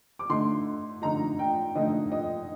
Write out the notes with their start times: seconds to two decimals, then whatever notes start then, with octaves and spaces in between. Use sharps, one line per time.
0.19 D6
0.29 D3 A3 D#4 C6
1.02 D3 A3 D#4 A#5
1.39 G5
1.75 D3 A3 D#4 D#5
2.12 D#5